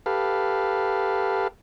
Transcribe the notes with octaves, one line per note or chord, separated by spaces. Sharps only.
G4 A4 B4 F5